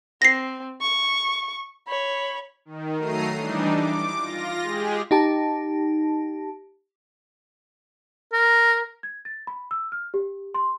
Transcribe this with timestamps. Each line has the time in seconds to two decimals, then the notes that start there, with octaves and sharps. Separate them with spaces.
0.22 C4 A#6 C7
0.81 C#6
1.87 C#5 B5
2.65 D#3
2.98 F#3 A3 A#5 C7 D#7
3.36 E3 G3 D4 D#4
3.70 D6
4.19 F4 A#6
4.62 G#3 G4 G#4
5.11 D#4 G4 A5
8.33 A#4
9.03 G#6
9.25 A6
9.47 B5
9.71 E6
9.92 F6
10.14 G4
10.54 C6